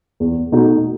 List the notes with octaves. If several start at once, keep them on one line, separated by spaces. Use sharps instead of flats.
E2
B2 A3 D#4 F#4